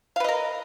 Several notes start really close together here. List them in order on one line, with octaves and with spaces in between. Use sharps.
F5 B4 D#5 A#4